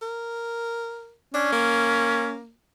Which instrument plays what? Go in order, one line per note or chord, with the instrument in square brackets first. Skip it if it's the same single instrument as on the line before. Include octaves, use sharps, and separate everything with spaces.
[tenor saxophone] A#4
[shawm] C#4 [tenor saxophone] D4
[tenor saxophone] A#3